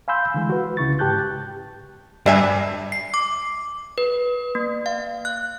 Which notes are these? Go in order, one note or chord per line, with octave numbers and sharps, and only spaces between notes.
F5 G#5 B5 C6 E6 G6
D3 E3 G#3
F#4 B4
C2 C#3 E4 C#6 A6
G#2 G4 A5 F#6 G6
G2 D4 E5 G#5
C7
D6
B4
A#3
F5
F#6